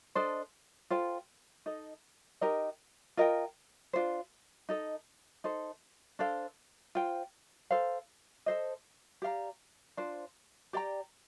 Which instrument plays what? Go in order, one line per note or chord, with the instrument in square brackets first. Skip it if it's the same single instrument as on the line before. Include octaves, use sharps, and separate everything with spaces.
[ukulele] D4 A4 C5 D#5
F4 A4 C5 G5
D#4 A4 D#5
D#4 G4 A#4 D#5
F4 A#4 D#5 G5
D4 F4 C5
D#4 A4 D#5
D#4 A4 C5
D4 A4 C5 F5
F4 C5 G5
A4 C5 F5
A4 C5 D#5
G4 D5 F5 A#5
D4 F4 C5
G4 D5 G5 A#5